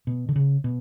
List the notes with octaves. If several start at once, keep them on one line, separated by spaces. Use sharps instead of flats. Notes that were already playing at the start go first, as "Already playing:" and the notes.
B2
D3
C#3
B2